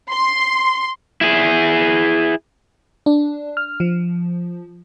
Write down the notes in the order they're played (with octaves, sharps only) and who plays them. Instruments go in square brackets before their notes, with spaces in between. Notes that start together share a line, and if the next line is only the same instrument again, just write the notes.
[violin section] C6
[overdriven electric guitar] E4 G#4
[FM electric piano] D4
F6
F3